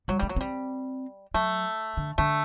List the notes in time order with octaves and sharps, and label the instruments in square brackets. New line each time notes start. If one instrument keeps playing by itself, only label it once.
[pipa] F#3 [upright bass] G3
[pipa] G3 [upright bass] A3
[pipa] F#3
[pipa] G3 [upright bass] C4
[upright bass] F#3 [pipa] A3
[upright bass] D3
[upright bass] D3 [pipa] A3